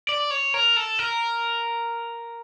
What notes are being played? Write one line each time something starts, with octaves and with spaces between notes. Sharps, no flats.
D5
C#5
A#4
A4
A#4